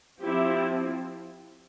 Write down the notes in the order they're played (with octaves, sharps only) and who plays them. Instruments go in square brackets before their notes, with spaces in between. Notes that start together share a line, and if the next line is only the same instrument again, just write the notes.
[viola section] F3 C4 E4 G4